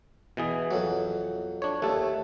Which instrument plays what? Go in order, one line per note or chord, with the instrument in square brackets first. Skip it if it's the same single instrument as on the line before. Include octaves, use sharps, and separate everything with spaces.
[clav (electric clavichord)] B2 E3 G#4
[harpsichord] F2 F#3
[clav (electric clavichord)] D4 C#5
[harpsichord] D#2 [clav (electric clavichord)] A3 A4